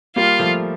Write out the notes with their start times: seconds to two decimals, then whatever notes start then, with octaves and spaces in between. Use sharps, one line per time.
0.16 G3 A#3 F4
0.39 F3 A3